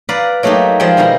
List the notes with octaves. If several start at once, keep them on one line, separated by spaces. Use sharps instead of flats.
B4 D5 F5 A#5 B5
F#3 A3 A#3 D#4 G4
F3 G3 G#3 G#4 G5
B2 D#3 E4 A#4 A#5